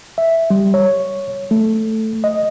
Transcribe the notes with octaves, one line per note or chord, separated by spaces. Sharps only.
E5
G3
C#5
A3
D#5